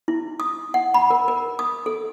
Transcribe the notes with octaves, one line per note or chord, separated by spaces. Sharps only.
E4
D#6
F#5
B5
A#4
A#4
D#6
A4